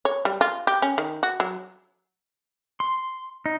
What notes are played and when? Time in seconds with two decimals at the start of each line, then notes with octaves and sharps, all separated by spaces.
0.05 C#5
0.25 G3
0.41 F4
0.67 G4
0.82 C#4
0.98 D#3
1.23 F#4
1.40 F#3
2.80 C6
3.46 D#4